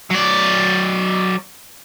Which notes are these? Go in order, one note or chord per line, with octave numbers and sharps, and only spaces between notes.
F#3 D5